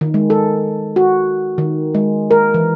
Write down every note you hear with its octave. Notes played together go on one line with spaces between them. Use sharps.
D#3
G#3
A4
F#4
D#3
G#3
A#4
E3